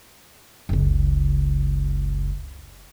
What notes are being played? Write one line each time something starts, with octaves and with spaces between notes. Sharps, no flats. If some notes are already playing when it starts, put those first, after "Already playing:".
F#1 C#2